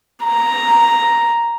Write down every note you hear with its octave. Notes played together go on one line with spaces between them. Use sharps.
A#5